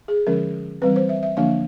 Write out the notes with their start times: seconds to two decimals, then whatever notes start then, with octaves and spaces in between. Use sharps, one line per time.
0.08 G#4
0.27 D3 F3 G#3 C#4 A#4
0.82 E3 G3 C4 B4
0.96 C5
1.09 E5
1.23 E5
1.37 D3 F3 A#3 D4 F5